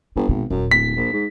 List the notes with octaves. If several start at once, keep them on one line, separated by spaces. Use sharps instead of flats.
G1 C3
G#1 B2
D#1 F#2
D1 B6
A#1
G#2